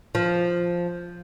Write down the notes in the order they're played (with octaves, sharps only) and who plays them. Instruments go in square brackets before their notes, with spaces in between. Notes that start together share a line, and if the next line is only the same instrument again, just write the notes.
[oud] F3